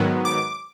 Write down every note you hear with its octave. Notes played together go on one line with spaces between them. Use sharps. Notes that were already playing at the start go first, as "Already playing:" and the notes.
Already playing: G#2 D#3 F#3 B3
D6